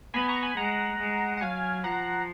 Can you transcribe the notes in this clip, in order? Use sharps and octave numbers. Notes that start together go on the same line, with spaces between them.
B3 G#5 B5
A#5 C#6
G#5 B5
G#3 F#5 A#5
G#3
F#5
F#3 F5 G#5
F3 F#5 A#5